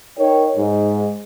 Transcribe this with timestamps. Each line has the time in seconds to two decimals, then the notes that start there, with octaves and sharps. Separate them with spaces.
0.18 D#4 A#4 C#5 G5
0.57 G#2